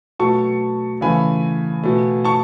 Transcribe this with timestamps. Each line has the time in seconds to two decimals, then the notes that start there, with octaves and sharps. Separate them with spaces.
0.19 B2 F#3 A3 A5 C#6
1.01 C#3 E3 A3 G#5 B5
1.83 B2 A3
2.24 A5 C#6